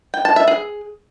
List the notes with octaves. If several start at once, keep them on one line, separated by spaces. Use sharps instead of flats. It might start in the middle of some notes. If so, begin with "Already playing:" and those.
G5
A5
E5
G#4